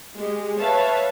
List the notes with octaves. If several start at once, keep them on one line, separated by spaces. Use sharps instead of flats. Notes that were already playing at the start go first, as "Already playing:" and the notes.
G#3 G4
B4 C#5 E5 F5 A5